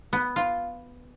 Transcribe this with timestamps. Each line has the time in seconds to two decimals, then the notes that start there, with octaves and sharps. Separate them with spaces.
0.13 B3
0.36 F4